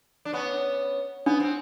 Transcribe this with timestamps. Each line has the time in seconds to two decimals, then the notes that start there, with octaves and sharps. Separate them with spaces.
0.25 D4
0.33 B3 C#4
1.26 B3 D4
1.40 C4